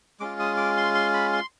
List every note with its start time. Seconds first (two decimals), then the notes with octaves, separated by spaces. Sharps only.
0.20 G#3 C#4 F4 D6
0.40 D#6
0.57 D6
0.77 C6
0.95 C6
1.14 B5
1.33 C6